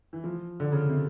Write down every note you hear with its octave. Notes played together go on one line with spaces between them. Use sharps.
E3
F3
D3
C#3
C3